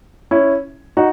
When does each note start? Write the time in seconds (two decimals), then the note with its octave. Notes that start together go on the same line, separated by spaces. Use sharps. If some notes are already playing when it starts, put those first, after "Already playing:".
0.31 C#4 E4
0.97 D#4 F#4